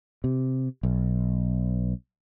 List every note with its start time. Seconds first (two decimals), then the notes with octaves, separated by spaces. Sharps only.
0.24 C3
0.83 B1